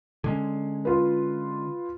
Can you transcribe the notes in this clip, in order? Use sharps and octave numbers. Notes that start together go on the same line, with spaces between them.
D3 G#3 C#4
F4 B4